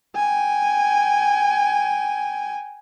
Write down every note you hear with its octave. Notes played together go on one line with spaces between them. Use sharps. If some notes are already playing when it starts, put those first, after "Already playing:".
G5 G#5